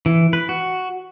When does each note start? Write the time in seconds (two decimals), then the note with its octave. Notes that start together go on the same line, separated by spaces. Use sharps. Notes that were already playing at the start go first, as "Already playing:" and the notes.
0.06 E3
0.33 B4
0.49 F#4